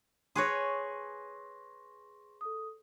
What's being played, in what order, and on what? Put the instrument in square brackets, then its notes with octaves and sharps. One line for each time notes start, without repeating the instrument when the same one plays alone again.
[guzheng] G#4 B4 C#5 [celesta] C6 C#6 A#6
[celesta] A4 D#6